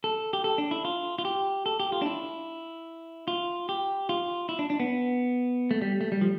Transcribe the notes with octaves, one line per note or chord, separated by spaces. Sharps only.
A4
G4
A4
D4
E4
F4
F4
G4
A4
G4
F4
D4
E4
F4
G4
F4
E4
D4
D4
B3
A3
G3
A3
G3
F3